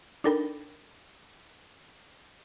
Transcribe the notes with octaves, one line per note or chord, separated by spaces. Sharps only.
D4 D#4 A4 A#4 G5 B5